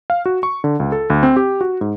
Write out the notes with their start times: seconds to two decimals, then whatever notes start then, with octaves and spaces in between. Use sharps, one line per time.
0.10 F5
0.26 F#4
0.43 C#6
0.64 D3
0.80 C#2
0.92 A4
1.10 D2
1.23 C4
1.36 G4
1.61 F#4
1.81 G#2